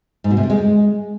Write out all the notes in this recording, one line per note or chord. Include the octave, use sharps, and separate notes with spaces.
G#2
B2
C3
D3
G#3